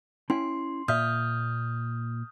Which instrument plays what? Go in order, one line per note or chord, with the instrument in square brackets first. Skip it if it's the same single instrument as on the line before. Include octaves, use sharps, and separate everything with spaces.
[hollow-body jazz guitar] C#4 E4 G5 [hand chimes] C6
[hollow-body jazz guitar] A#2 E5 [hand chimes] D#6 F6 G6